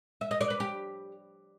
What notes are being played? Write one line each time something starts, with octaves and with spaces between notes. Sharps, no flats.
E5
D#5
D5
B4
G4